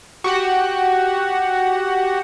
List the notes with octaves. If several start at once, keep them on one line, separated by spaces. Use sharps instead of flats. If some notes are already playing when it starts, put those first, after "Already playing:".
F#4 G4 F#5